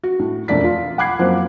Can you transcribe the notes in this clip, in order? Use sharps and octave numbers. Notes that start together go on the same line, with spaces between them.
F#4
A2
E1 F2 A3 D5 B6
F4
F#5 B5 D6 F#6 G#6 C7
F#2 F3 A#3 C4